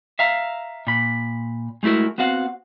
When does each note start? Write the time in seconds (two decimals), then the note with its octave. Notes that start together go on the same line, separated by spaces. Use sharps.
0.19 E5 F5 A#5
0.87 A#2 B5
1.83 G#3 A3 E4 F#4 A#4
2.18 B3 C4 F#4 F5 F#5